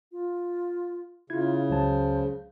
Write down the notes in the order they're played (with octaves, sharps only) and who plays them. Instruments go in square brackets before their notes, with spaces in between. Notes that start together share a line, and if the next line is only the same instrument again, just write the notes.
[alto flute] F4
[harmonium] C#3 [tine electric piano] E4 G#6 [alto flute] F4
[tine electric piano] C#2 F#3 A5 [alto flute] C5